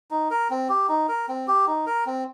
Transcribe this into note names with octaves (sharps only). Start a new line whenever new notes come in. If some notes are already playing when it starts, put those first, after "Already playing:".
D#4
A#4
C4
G4
D#4
A#4
C4
G4
D#4
A#4
C4